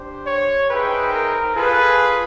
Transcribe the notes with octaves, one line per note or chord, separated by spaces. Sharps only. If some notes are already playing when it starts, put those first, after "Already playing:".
Already playing: D4 G4 C5
C#5
D#4 G#4 B4 C5 E5 G5
A#4
F4 G#4 A4 B4